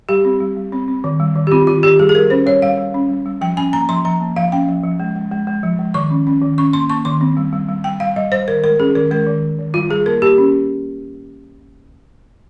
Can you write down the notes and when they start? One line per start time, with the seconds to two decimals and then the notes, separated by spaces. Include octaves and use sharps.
0.09 G3 G4
0.25 C4
0.40 G3
0.57 G3
0.72 C4
0.88 C4
1.04 D#3
1.20 G3
1.35 D#3
1.47 G4
1.51 C4 F4
1.67 D#3 F4
1.83 D#3 G4
1.99 G3 G#4
2.09 G#4
2.15 G3 A#4
2.30 C#4 C5
2.46 G3 C#5
2.62 G3 F5
2.78 G3
2.94 C#4
3.09 G3
3.26 G3
3.41 F3 G5
3.57 C#4 G#5
3.73 A#3 A#5
3.89 F3 C6
4.05 F3 A#5
4.21 A#3
4.36 F3 F5
4.52 C#4 G5
4.68 F3
4.83 F3
5.00 G#3
5.16 G#3
5.32 G#3
5.47 G#3
5.63 F3
5.79 G#3
5.94 D#3 C#6
6.11 C#4
6.27 C#4
6.42 D#3
6.58 C#4 C#6
6.73 A#3 C6
6.90 A#3 C#6
7.05 D#3 C6
7.21 C4
7.37 G3
7.53 G3
7.69 G3
7.84 G3 G5
8.00 G3 F5
8.16 G3 D#5
8.32 G3 C5
8.48 D#3 A#4
8.63 G#3 A#4
8.79 C#4 G#4
8.95 D#3 A#4
9.11 G#3 A#4
9.27 D#3
9.43 D#3
9.59 D#3
9.74 G3 F4
9.90 G3 G#4
10.06 A#3 A#4
10.22 A#3 G4
10.38 C#4